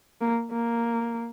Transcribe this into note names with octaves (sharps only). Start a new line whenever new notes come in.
A#3
A#3